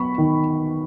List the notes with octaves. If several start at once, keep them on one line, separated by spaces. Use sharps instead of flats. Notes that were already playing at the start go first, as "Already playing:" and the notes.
Already playing: F#3 B3 B5 C#6
D#3